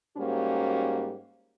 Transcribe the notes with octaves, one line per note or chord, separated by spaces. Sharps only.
G#2 G3 A#3 C#4 F#4